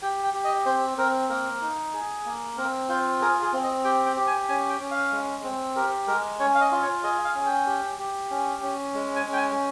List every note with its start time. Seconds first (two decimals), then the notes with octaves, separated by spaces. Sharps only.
0.02 G4 G5
0.24 G5
0.34 G4
0.45 D#5
0.66 C4 C5
0.98 C4 A#4
1.30 A#3 A#4
1.62 D#4
1.94 G#4
2.25 A#3
2.57 C4 A#4
2.89 F4 C5
3.21 G#4 A#4
3.42 G#4
3.53 C4
3.64 D#5
3.84 G4 G5
4.06 G5
4.17 G4
4.27 G#5
4.49 C#4 G#5
4.69 G5
4.80 C#4
4.91 F5
5.12 G#3
5.44 C4
5.76 G4 A#4
6.07 G#3 A#4
6.39 C#4 C#5
6.55 F5
6.61 D#5
6.72 F4
6.82 C#5
7.03 G#4 D#5
7.25 F5
7.35 C#4
7.45 G5
7.67 G4
7.99 G4
8.30 C#4
8.62 C#4
8.94 G#3
9.16 G#5
9.26 C#4
9.33 G5
9.37 G#5